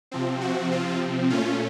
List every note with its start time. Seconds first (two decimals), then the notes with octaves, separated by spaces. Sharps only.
0.11 C3 F3 C4
0.41 F#4
0.71 F4
1.30 A#2 A3 C#4 F4